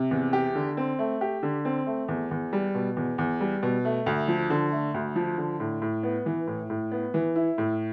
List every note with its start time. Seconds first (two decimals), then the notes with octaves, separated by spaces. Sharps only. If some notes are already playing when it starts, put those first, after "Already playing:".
Already playing: C3
0.11 E2
0.33 G4
0.55 D3
0.77 C4
0.99 A3
1.21 G4
1.43 D3
1.65 C4
1.87 A3
2.08 E2
2.31 E2
2.53 G3
2.74 B2
2.97 E2
3.18 E2
3.40 G3
3.63 B2
3.85 A3
4.06 D2
4.28 F3
4.50 D3
4.72 A3
4.94 D2
5.16 F3
5.38 D3
5.60 A2
5.82 A2
6.03 B3
6.26 E3
6.47 A2
6.70 A2
6.92 B3
7.14 E3
7.36 E4
7.58 A2